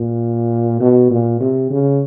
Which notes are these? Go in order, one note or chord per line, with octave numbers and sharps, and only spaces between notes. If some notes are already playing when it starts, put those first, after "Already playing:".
Already playing: A#2
B2
A#2
C3
C#3